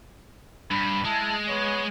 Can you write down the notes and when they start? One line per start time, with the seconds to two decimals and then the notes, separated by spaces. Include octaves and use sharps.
0.71 G2 B5
1.05 G#3 E4 A5
1.49 B3 B4 C#5